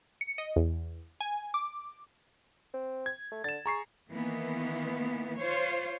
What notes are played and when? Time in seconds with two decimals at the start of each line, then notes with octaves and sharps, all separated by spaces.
0.21 C#7
0.38 D#5
0.56 E2
1.21 G#5
1.54 D6
2.74 C4
3.06 G#6
3.32 A3
3.44 D3 A6 E7
3.66 G#4 A#5 C#6 C7
4.10 D#3 E3 A#3 B3
5.38 F4 C5 C#5